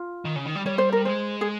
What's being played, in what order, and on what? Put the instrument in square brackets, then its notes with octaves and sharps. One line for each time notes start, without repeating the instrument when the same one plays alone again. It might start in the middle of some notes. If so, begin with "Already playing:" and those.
Already playing: [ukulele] F4
[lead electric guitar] D#3
C#3
D#3
G3
[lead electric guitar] G3 [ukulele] C#5
[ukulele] C5
A#4
[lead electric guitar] G#3 [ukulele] C5
[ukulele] G#4